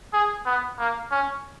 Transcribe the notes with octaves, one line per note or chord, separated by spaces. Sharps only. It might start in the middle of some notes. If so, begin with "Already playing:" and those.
G#4
B3
A#3
C#4